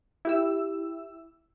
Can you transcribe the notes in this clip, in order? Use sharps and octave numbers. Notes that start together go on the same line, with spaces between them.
E4 G4 E6